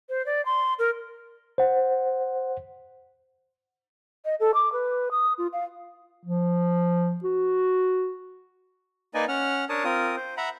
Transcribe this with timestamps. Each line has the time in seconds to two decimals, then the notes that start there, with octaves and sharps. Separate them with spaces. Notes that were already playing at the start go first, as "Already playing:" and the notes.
0.09 C5
0.26 D5
0.46 C6
0.79 A#4
1.58 C5 F#5
4.25 D#5
4.40 A4
4.54 D6
4.73 B4
5.11 D#6
5.38 F4
5.53 F5
6.25 F3
7.24 F#4
9.14 A#3 D#4 B4 D5 D#5 G#5
9.28 C#4 F#5 F6
9.69 D4 A#4 C#5 A5 D#6
9.84 C4 F4 A#4 D#6
10.16 C5
10.37 E5 F#5 A#5 B5